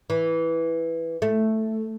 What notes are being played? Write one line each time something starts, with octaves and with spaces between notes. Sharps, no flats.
E3
A3